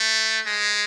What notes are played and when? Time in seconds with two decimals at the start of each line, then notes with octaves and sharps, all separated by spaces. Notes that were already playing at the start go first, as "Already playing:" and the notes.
Already playing: A3
0.46 G#3